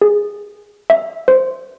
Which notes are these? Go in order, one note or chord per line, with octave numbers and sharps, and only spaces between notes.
G#4
E5
C5